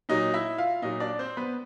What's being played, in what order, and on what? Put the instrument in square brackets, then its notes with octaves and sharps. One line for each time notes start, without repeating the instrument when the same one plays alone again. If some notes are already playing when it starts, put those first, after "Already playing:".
[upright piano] A#2 F#3 D#4 D#5
E4 E5
F4 F5
A#2 F#3 D#4 D#5
D4 D5
C4 C5
B3 B4